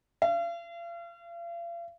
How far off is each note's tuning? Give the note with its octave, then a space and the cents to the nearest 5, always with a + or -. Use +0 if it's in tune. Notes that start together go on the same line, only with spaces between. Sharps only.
F5 -40